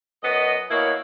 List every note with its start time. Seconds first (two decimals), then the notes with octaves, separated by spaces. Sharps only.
0.23 F#2 B3 D#5
0.69 B2 A#3 E4 C#5 D#5